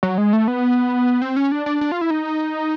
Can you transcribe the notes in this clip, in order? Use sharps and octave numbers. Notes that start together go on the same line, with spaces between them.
F#3
G#3
A3
B3
C4
C#4
D4
D4
D4
F4
E4
D#4